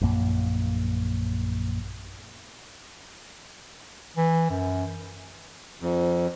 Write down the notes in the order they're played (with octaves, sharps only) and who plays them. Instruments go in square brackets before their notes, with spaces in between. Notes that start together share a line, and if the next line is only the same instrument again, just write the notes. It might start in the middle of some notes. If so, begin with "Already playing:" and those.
[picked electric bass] A#1 F#2 A#3
[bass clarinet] E3
F#2
[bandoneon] F2